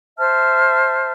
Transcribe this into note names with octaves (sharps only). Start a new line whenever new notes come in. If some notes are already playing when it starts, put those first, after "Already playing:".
C5 E5 A5 F6